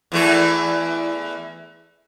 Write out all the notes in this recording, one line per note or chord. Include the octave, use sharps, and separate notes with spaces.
E2 E3 A3